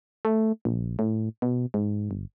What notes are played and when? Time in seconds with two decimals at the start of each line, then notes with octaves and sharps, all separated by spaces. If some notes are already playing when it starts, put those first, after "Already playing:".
0.25 A3
0.65 A#1
0.99 A2
1.42 B2
1.74 G#2
2.11 G1